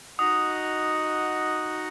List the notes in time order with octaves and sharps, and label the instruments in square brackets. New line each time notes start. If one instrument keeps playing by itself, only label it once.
[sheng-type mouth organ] D#4 F#4 D#5 F#5 [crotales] D#6